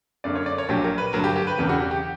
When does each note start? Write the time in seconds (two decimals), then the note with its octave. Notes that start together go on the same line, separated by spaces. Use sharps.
0.24 F#2 D3 A#3 D5
0.35 C#5
0.46 D5
0.58 C#5
0.69 A#1 A#2 F#3 G4
0.84 A#4
0.98 B4
1.13 G1 G2 F#3 A#4
1.24 G4
1.36 G4
1.47 B4
1.58 E1 E2 C#3 G4
1.69 F#4
1.80 G4
1.91 G4